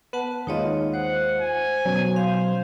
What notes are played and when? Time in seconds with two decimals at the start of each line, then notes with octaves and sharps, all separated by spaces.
0.13 B3 B4 F#5 A5
0.47 D#2 G#3 D#4 F4 C#5 D#5
0.94 C5 F#5
1.40 G#5
1.86 B2 F#3 C#4
2.16 C5 F5